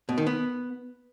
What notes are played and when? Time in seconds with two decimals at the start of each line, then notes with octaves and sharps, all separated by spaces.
0.09 B2
0.18 D#3
0.27 B3